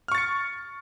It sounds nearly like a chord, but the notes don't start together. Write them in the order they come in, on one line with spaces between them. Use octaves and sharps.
F6 C#6 A6 C#7